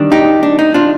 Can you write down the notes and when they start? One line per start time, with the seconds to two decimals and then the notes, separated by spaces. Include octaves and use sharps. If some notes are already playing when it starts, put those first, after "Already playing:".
Already playing: D#3 G3 D4
0.12 D#4 G4
0.43 D4
0.59 D#4
0.74 D4 F4